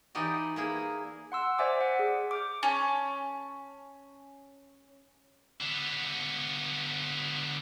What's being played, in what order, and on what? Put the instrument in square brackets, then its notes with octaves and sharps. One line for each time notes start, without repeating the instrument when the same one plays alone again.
[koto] E3 D#4 G4 D5 D#5
A#3 E4 G#4
[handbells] F#5 C6 E6
C5 D5 E5 G#5 D6
F#5
G#4
D6 F6 G6
[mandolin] C#4 A5
[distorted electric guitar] D3 B3